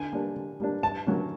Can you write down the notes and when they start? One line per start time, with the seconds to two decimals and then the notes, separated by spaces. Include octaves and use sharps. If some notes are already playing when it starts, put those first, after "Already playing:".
Already playing: D3 G#5
0.12 G3 A#3 D4
0.36 D3
0.60 G3 A#3 D4
0.83 G2 A5
1.07 D3 F#3 A#3 C#4